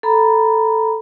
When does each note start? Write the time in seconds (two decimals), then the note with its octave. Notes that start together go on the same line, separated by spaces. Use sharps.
0.03 A4 A#5 B5